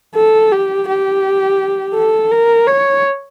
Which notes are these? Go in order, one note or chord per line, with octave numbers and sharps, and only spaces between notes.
A4
G4
G4
A4
A#4
C#5